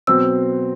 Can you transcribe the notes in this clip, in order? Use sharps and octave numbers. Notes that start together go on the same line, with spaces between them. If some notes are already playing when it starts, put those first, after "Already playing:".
B2 F#3 C4 E6